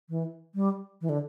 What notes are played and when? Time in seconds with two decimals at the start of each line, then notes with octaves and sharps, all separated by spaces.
0.10 E3
0.55 G3
1.01 E3
1.09 D3